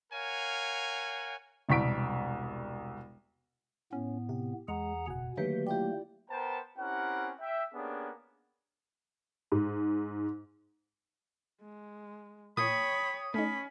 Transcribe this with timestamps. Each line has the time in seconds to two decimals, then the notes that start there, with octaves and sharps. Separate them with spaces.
0.12 A#4 C#5 F5 F#5 G#5
1.69 E1 C2 C#6 B6 D7
3.93 A2 B3 C#4
4.29 C3 G4
4.68 E2 G#3 G#4 F#5 A#5
5.07 F#1 B2 F#5 G#5
5.37 D3 D#3 F#3 A3 A#3 G4 B4 G6
5.67 E4 F4 G4 D5 G5
6.30 B3 A#4 C5 G5 A5 A#5
6.78 C4 C#4 E4 G4 A#4 F#5
7.41 E5 G5
7.74 A#3 B3 C#4 D4 G4 G#4
9.52 G#2
11.61 G#3
12.57 A#2 C#5 G5 B5 D#6
13.34 A3 C#4 D#4 B5